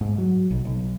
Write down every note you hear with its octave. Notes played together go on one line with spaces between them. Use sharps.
G#2
F#3
B1
B1